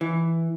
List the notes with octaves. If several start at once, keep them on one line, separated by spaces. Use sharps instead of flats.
E3